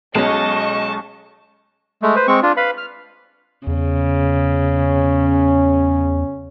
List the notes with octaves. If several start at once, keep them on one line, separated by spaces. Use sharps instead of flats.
B1 G#3 C#4 D#5 A5 C#6
G#3 A3
B4 C5
G#3 C4 C#6
D4 F4
B4 F5 B5
F6
E2 C#3
C#4